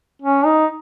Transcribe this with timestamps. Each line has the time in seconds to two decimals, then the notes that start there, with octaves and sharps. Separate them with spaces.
0.22 C#4
0.45 D#4